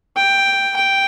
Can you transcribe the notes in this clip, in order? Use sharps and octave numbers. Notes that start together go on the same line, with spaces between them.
G5
G5